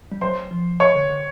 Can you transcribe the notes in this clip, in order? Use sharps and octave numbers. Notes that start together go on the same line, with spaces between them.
G3
F#3 C5 C6
F3
C#5 C#6
D3
D3